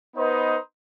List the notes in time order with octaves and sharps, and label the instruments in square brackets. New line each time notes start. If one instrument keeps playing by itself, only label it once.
[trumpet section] B3 D#4 B4 C5 D#5